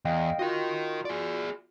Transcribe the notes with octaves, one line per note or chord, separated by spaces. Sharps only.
E2 D#5 F5 G5
F4 F#4 A#4 D#5
G#4 D5